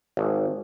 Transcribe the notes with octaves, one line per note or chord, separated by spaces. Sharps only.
G#1